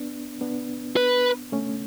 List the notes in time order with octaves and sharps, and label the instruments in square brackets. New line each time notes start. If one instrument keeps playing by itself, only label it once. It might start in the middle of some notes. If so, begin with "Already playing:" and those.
Already playing: [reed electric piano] B3 D4
B3 D4
[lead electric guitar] B4
[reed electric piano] A3 C#4